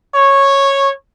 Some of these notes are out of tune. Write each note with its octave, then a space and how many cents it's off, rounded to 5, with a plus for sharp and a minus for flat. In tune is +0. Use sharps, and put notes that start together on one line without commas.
C#5 -10